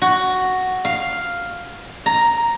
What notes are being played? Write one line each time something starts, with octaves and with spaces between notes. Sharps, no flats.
F#4
F5
A#5